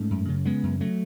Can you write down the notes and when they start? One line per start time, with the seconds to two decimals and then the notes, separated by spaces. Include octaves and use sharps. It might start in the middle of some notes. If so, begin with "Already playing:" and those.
Already playing: G#2 A3 C#4
0.10 F#2
0.28 C#3
0.45 C#3 G#3 B3
0.63 F#2
0.81 F#3 A3